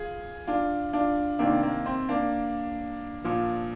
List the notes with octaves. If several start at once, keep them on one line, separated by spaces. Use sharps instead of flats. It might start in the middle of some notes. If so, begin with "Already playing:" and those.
Already playing: F4 G#4
D4 F4
D4 F4
C3 D#3 A#3 D4
A#3
C4
A#3 D4
A#2 F3